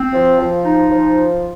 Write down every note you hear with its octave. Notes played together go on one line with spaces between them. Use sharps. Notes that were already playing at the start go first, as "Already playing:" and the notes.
Already playing: C4
F3
F3
D#4
F3